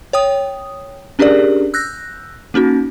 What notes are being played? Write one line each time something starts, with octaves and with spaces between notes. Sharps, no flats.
C#5 G5 D#6
C#4 D4 G4 G#4 A#4 D5
E6 F#6 G6 A#6
A#3 C#4 D#4 F#4